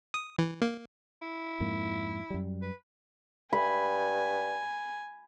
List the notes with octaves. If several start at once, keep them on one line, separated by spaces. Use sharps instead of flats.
D#6
E3
A#3
E4
F2 G#2 A#3
F#2 G3
B4
G2 G#5 B5